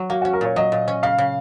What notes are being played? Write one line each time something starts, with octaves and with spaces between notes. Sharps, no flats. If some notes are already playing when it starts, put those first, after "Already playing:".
Already playing: F#3
A#3 F#4
C#4 F#4
A#4
A#2 C#5
F#3 D#5
A#2
C#4
C#3 F5
C#3